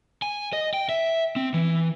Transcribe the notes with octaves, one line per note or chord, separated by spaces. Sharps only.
G#5
D#5
G5
E5
C4
E3